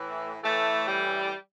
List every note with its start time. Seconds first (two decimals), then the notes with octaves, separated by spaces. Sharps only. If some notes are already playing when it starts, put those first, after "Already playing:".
Already playing: A2 E3
0.41 A2 E3 A3
0.87 G3